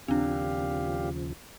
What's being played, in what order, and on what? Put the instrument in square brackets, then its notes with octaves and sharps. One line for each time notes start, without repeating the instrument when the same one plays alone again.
[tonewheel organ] D#2 C#3 F3 [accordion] A#2 G4 F5 [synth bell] C4 D4